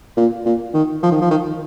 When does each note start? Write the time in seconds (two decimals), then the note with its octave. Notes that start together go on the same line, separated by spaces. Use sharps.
0.17 A#2
0.45 A#2
0.74 D#3
1.03 F3
1.12 D#3
1.21 F3
1.31 D#3